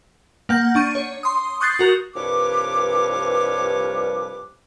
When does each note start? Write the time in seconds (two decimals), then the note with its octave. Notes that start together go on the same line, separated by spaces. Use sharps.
0.49 A#3 F#5 G6
0.75 D4 C#6 D#7
0.95 C#5
1.23 C6 D#6
1.61 C#6 D#6 F#6 G6 A6 C7
1.79 F#4 A#4
2.15 C2 G2 F3 B4 C#5 D6